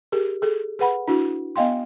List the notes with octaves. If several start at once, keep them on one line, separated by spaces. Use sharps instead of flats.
G4 G#4 A#4
G#4 A4
G#4 B4 F#5 B5
D4 E4 F#4
B3 D#5 F5 G5 C6